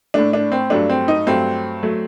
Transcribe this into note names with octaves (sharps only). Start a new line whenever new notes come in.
A2 A3 D4
D4
C4
G2 F#3 A3 D4
C4
D#4
G2 F#3 A3 C4
F#3 A3